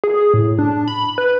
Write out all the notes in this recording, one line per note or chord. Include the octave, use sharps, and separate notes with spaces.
G#4
A2
D4
B5
B4